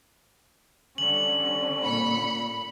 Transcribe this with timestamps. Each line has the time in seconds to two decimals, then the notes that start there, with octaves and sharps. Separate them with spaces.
0.98 D3 G3 C#4 F#7
1.82 A#2 B5 C#7